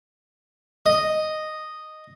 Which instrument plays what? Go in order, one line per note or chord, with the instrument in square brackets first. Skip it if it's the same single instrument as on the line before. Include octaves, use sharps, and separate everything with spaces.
[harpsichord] D#5